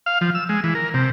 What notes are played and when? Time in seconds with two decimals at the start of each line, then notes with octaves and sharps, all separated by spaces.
0.06 F5
0.21 F3
0.35 E6
0.49 G#3
0.64 E3
0.75 A#4
0.94 C3